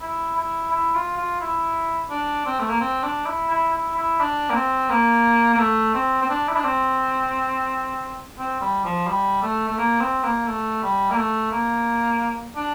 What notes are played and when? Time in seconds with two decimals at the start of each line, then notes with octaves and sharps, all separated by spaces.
0.01 E4
0.37 E4
0.71 E4
0.95 F4
1.17 F4
1.41 E4
2.10 D4
2.46 C4
2.59 A3
2.70 A#3
2.81 C4
3.03 D4
3.26 E4
3.51 E4
3.73 E4
3.96 E4
4.20 D4
4.50 A#3
4.55 C4
4.90 A#3
5.54 A#3
5.59 A3
5.94 C4
6.22 C4
6.30 D4
6.49 E4
6.56 D4
6.64 C4
8.38 C4
8.61 G3
8.85 F3
9.07 G3
9.43 A3
9.68 A3
9.78 A#3
10.00 C4
10.23 A#3
10.47 A3
10.83 G3
11.11 A#3
11.17 A3
11.51 A#3
12.56 D4